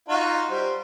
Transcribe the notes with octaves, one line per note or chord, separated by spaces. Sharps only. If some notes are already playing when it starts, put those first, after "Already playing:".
D#4 F4 F#4
G3 C5